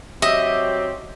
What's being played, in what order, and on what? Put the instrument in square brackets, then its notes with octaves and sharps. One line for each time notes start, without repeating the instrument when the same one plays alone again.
[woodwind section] F#3 C4 G4 [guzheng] D#5 [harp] E5